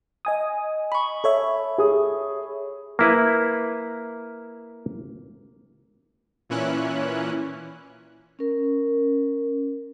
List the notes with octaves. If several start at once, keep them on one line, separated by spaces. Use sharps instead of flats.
D#5 G#5 D#6
B5 C#6
A4 C#5 E5
G#4 D#6
A#3 E4 B4
A#2 E3 C#4 E4 F#6
C#4 A#4